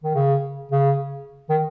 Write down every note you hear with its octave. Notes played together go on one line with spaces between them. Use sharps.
D#3
C#3
C#3
D#3